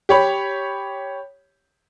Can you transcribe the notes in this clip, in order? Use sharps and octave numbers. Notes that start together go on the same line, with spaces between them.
G4 C#5 B5